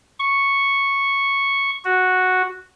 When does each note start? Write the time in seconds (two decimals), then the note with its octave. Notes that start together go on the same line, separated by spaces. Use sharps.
0.19 C#6
1.85 F#4